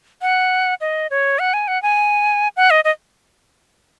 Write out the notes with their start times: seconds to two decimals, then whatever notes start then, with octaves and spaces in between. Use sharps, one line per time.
0.22 F#5
0.81 D#5
1.11 C#5
1.39 F#5
1.54 G#5
1.68 F#5
1.83 G#5
2.57 F#5
2.70 D#5
2.85 D#5